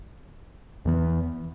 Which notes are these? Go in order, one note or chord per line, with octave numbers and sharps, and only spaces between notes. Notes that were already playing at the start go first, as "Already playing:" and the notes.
E2 E3 B3